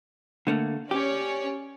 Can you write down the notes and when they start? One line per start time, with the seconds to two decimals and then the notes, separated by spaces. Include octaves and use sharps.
0.47 D3 A3 A#3
0.91 C#4 G4 C#5 D5